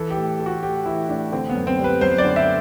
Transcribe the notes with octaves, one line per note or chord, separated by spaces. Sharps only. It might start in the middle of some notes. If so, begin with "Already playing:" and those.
Already playing: E3 A4
G4
A2
A3
F#4
A2 G4
E3 E4
A2 D4
D3 C4
B3
F#2
C4
G3
B4
F#2 C5
D5
D3
E5